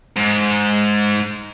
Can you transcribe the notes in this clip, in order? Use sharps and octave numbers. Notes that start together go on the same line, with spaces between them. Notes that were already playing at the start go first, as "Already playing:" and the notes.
G#2